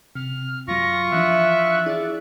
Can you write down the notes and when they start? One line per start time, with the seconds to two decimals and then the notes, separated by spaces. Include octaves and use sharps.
0.15 C3 F6
0.68 F#2 F#3 F4 C#6 A#6
1.12 E3 F3 D4 E5 F#6
1.86 D4 E4 G#4 D5